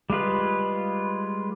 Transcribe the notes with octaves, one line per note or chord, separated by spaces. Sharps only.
G3 G#3 F4 B4